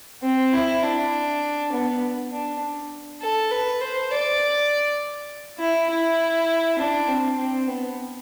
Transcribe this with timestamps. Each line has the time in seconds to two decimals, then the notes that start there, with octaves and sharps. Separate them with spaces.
0.23 C4
0.53 E4
0.82 D4
1.72 B3
2.31 D4
3.21 A4
3.51 B4
3.81 C5
4.11 D5
5.59 E4
5.89 E4
6.79 D4
7.08 C4
7.38 C4
7.68 B3